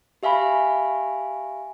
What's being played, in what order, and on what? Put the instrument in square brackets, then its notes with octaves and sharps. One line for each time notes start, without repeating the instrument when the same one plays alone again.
[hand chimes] G4 E5 F5 G#5 B5